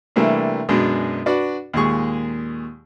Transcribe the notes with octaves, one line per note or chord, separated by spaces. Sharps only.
C3 E3 G3 A3 A#3 D4
F#2 B2 G#3 D4
D4 F#4 B4 D5
D#2 A#2 G#3 G#4 C#6